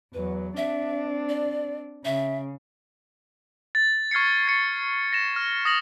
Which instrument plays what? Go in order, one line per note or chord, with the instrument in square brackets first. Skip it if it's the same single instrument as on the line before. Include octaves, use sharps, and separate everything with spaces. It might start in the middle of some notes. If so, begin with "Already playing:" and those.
[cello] E2 F#3 [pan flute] B4
[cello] C4 D4 [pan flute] E5
[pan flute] D5
[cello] C#3 [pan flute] E5
[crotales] A6
C#6 F6 G#6 C7 C#7
A6 C#7
A#6 E7
F6
D#6 A#6 F#7